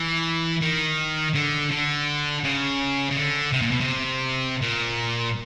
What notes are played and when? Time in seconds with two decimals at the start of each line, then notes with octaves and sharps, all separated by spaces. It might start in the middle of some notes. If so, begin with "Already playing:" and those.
Already playing: E3
0.62 D#3
1.34 D3
1.71 D3
2.44 C#3
3.11 C#3
3.16 D3
3.53 C3
3.62 A#2
3.72 B2
3.81 C3
4.62 A#2